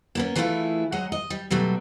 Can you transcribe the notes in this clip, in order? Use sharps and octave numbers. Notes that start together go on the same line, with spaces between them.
A#3 B3 C#4
E3 A3 C#4 E4 F4 G#4
F#3 G#3 D#5 F#5
D#5
G3
B2 F#3 G3 A3